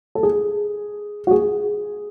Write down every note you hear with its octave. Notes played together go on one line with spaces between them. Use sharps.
A4
G#4
F#4
G#4